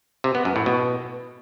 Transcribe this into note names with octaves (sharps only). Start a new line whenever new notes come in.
C3
B3
F#2
A2
B2